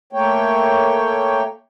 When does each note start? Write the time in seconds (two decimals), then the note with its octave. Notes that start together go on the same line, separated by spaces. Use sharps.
0.13 A3 A#3 C#5 G5